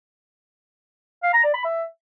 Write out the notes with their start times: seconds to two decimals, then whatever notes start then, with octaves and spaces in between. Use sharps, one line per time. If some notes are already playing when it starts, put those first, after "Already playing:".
1.23 F5
1.33 A#5
1.44 D5
1.54 B5
1.65 E5